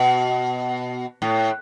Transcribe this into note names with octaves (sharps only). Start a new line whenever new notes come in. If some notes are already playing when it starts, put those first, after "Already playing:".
Already playing: B2
A2